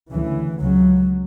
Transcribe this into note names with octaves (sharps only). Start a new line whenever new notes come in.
D2 C#3 E3
C#2 C#3 F#3